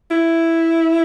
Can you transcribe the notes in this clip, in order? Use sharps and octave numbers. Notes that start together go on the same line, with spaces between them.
E4